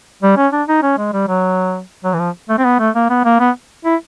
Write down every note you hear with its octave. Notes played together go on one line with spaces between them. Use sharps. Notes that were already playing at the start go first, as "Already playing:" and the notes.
G3
C#4
D4
D#4
C#4
G#3
G3
F#3
F#3
E3
F3
A3
C4
B3
A3
A#3
B3
A#3
B3
E4